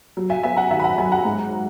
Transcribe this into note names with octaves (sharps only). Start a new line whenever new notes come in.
F#3
E5 G#5
B3 E5 G#5
F#5 A#5
D#3 E5 G#5
B5
F#5 A#5
F#3 G#5 B5
F#5 A#5
G#2